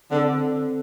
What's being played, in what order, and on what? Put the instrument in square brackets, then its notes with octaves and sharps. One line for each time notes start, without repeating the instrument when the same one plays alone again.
[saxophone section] D3 [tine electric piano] C4
[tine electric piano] A4